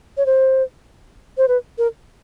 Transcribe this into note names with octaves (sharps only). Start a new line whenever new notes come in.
C#5
C5
C5
B4
A#4